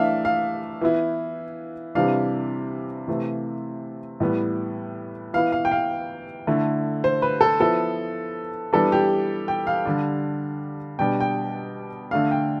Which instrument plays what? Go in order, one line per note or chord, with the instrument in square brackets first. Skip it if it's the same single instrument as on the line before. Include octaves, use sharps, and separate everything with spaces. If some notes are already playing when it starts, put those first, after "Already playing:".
Already playing: [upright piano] E3 A3 D4 E5 F5
F5
E3 B3 E4
C3 E3 G3 D4 F5
C3 E3 A3
A2 E3 G3 B3
E3 B3 E4 F5
F5
G5
F5
D3 A3 E4
C5
B4
A4
F3 B3 E4 A4
E3 G3 B3 D4 A4
G4
G5
F5
D3 G3 D4
B2 G3 D4 G5
G5
D3 A3 D4 F5
G5